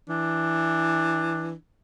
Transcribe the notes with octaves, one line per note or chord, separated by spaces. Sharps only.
E3 D4